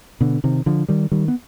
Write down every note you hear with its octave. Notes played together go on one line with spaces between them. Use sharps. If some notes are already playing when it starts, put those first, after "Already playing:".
B2 D3
C3 D#3
D3 F3
D#3 G3
D#3 G3
B3